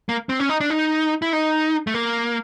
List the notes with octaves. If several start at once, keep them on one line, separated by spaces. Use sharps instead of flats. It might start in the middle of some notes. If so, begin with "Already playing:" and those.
A#3
C4
C#4
D#4
D4
D#4
E4
D#4
A3
A#3